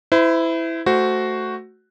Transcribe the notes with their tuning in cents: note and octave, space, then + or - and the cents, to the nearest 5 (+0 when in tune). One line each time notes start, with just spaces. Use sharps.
E4 +0 C5 -40
A3 +0 F#4 +5 C5 -5